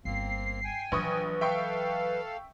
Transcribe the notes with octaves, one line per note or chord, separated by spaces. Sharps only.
G1 A#3 C4 C7
G5 G#5
A#1 E3 F#3 B4 C#6 D#6
A4 E5 F5 G5 C#6